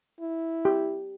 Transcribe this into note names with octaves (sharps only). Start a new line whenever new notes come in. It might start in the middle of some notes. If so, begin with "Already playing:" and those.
E4
G4